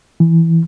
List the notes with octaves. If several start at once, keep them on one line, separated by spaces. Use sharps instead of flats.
E3